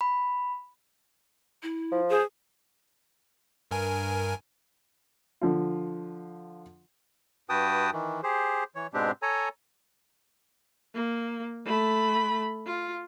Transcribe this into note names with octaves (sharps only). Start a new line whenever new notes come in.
B5
E4
F3
G#4 C5
G2 A#4 G#5
D3 F3 F4
G2 F#4 B4 G5 A5 D#6
D#3 E3
G4 G#4 C5
E3 C#5
G#2 B2 G#3 C4 D4 G4
A4 C#5 G#5 A#5
A#3
A3 B5
F4